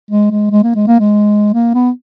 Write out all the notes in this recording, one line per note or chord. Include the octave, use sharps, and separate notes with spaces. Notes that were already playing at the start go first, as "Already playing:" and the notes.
G#3
G#3
G#3
A#3
G#3
A#3
G#3
A#3
B3